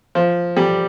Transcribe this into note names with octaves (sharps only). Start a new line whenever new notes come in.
F3
G3